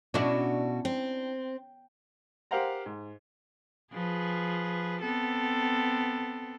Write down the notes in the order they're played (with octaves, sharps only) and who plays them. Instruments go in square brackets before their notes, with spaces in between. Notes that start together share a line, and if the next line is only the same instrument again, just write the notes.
[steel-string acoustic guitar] B2 F#4 [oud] C#4 D4 E4
[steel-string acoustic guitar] C4
[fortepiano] G4 A#4 C5 F5 F#5 A#5
G#2
[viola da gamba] F3 G#4 B4
B3 C4 A4